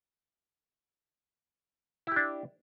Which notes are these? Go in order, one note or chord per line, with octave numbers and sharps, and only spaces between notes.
D4 E4 G4